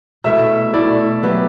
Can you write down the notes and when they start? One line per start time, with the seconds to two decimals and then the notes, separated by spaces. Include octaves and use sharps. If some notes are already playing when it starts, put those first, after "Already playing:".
0.24 B2 A3 E4 E5
0.74 B2 A3 E4 D5
1.23 F#3 B3 E4 G4